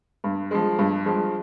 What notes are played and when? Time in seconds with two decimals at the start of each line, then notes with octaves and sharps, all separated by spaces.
0.24 G2
0.51 F3 G#3
0.79 G2
1.06 F3 G#3